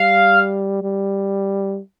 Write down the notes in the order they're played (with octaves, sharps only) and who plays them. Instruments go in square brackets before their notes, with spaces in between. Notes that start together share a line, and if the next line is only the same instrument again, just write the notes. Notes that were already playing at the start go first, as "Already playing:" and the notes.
Already playing: [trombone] G3 [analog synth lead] F5
[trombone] G3